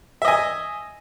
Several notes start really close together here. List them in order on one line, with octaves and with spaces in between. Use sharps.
E5 D#5 G#5